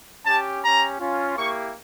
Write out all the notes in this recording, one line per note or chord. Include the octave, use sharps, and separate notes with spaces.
C#4 G4 A5
C#4 G4 A#5
C#4 F4
A#3 E4 G4 C#6